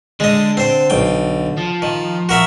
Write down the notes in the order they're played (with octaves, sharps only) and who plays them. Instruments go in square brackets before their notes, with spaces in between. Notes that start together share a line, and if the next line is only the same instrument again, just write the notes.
[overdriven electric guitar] D3 [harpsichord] G#3 D#5
[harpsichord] C4 C5
B1 G5
[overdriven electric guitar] F3
[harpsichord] D#3
F#4 A#4 E5